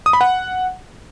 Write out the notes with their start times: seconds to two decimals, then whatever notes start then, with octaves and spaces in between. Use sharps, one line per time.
0.06 D#6
0.13 B5
0.21 F#5